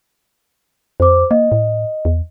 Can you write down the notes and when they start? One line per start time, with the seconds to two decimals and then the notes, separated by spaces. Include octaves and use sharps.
1.00 F2 C5 D6
1.31 A#3 D#5
1.52 A2
2.05 E2